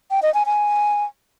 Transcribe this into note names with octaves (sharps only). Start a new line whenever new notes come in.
G5
D#5
G#5
G#5